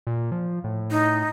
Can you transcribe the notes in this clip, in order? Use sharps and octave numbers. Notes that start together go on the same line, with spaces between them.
A#2
F3
A2
D#4